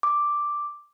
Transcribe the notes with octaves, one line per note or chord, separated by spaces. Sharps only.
D6